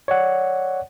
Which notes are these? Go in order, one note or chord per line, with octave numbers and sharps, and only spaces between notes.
C#5 D5 F#5